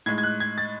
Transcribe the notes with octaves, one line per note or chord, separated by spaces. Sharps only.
A2 G#3 D#4 G#6
G#6
F#6
G#6
A6